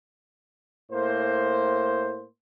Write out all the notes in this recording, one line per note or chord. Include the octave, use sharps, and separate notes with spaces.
A2 A#3 C5